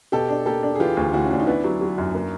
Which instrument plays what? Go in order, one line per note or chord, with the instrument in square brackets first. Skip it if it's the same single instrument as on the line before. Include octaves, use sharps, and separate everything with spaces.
[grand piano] B2 [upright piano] G4 A4
[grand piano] D4
[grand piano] A#3 [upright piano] G4 A4
[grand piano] D4
[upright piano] G#4
[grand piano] E3 [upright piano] F4 G4
[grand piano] D2
[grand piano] D2 [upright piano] E4 F#4
[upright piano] C#4
[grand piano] D2 [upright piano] D4
[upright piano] D#4
[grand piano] B3 [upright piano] D4 E4
[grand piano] F#3
F#3
F#2
A#3